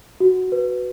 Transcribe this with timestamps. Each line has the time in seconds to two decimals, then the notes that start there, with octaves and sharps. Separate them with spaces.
0.20 F#4
0.52 B4